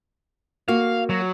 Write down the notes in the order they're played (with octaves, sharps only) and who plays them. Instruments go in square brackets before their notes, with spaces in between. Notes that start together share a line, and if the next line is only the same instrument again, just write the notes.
[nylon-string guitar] A#3 F#4 [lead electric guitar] F5
[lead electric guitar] F#3